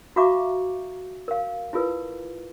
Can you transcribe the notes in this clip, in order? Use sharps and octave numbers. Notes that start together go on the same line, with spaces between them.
F#4 E5 F5 A#5 C#6 D6
A#4 F5
E4 F4 G#4 A#4 B4